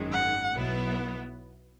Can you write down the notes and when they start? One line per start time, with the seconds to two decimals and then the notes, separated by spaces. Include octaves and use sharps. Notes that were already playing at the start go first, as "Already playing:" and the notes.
Already playing: G#1 F#2 D#3 G#3
0.12 F#5
0.52 B1 B2 F#3 B3 E4